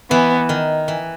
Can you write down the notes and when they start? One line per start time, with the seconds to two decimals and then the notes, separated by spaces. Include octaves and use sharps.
0.11 E3 B3
0.49 D#3
0.88 E3